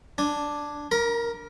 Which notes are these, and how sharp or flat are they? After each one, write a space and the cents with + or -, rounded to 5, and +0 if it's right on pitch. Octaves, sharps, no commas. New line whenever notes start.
D4 +0 G#5 +0
A#4 +0 A#5 +45